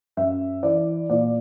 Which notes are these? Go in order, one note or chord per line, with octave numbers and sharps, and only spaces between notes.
F#2 E5
E3 D5
A#2 D5